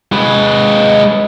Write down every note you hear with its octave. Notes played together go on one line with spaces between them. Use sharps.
G#3 B4